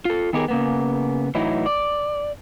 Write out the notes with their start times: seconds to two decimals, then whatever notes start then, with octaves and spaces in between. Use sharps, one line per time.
0.05 F4 A4
0.33 D#3 B3 D#4 G4 G#4 A#4
0.48 C#3 A#3 B3
1.35 A2 E3 F#3 D#4 E4
1.66 D5